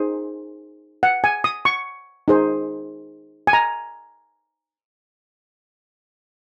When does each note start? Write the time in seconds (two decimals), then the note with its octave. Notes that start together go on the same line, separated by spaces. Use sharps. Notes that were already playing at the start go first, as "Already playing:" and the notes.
Already playing: D#4 G#4 C5
1.03 F#5
1.24 G#5
1.44 D#6
1.65 C#6
2.28 D#4 G#4 C5
3.47 G#5
3.53 A#5